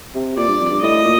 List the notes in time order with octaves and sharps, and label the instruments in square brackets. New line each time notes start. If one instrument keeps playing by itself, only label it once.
[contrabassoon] C3
[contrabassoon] A#2 [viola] D5
[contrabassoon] G2
F2
G2
[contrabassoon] A2 [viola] D#5
[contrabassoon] A#2